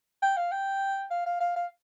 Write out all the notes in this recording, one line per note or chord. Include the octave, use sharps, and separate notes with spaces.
G5
F5
G5
F5
F5
F5
F5